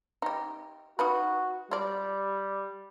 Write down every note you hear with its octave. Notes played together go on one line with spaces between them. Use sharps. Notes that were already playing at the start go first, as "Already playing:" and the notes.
D#4 G4
D#4 F4 F#4 B4
G3 F4 D5